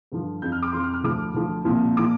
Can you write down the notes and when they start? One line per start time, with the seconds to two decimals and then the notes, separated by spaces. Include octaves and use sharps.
0.12 G2 D3 F3
0.42 F2 F3 G6
0.52 F6
0.62 D6
0.73 F2 F3 C6
0.83 F6
0.94 F6
1.04 D2 D3 F3 D6
1.34 D2 D3 F3
1.65 C2 A#2 F3
1.97 A#2 F3 D6